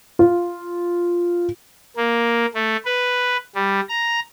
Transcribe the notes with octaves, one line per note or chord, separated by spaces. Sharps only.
F4
A#3
A3
B4
G3
A#5